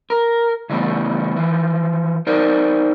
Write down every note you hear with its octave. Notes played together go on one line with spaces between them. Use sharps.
A#4
C#3 E3 G3 A3 B3
E3 F3
D#4 A#4 C5 D5